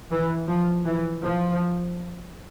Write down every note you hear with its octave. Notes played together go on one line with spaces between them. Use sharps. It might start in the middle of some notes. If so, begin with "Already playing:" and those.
E3
F3
E3
F3